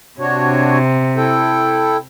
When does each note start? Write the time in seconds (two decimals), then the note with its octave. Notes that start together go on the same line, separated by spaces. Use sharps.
0.19 C3 D4 F#4 C#5
1.17 E4 A4 G5